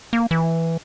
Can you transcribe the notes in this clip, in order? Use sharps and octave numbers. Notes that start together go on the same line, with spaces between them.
A#3
E3